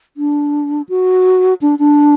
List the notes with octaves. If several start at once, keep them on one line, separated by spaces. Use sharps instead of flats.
D4
F#4
D4
D4